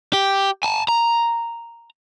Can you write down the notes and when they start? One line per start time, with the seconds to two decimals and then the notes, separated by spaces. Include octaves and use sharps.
0.13 G4
0.63 G#5 A5
0.89 A#5